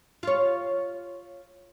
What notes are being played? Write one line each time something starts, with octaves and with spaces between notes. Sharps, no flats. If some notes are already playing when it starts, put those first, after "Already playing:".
F4 C#5